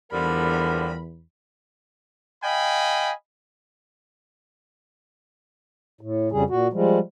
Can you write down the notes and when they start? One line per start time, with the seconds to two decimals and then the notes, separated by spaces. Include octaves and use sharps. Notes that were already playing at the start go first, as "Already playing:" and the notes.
0.12 E2 D3 F3 G3 A#4 B5
2.43 D#5 F5 G5 G#5 B5
6.01 A2
6.32 F2 C#3 G3 G#4
6.50 A#2 F#4
6.73 F3 G3 G#3